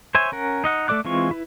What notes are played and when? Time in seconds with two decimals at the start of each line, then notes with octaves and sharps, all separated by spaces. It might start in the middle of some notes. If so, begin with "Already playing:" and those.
0.15 C5 C#5 E5 G#5
0.32 C#4 A#4 F#5
0.64 D#4 D#5 F#5
0.88 A3 A4 D5 D6 F#6
1.05 E3 G#3 C4 F4 C#6
1.31 E4 B4